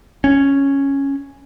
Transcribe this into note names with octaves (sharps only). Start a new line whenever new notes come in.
C#4